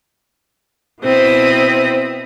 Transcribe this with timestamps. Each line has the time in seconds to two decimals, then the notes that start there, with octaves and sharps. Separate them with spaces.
1.01 B2 C4 E4 D#6